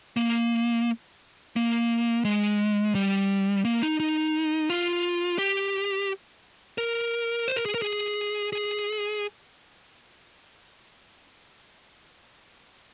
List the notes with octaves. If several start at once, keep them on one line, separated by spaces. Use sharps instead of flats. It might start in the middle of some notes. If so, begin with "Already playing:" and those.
A#3
A#3
G#3
G3
A#3
D#4
D#4
F4
G4
A#4
C5
A#4
G#4
A#4
G#4
G#4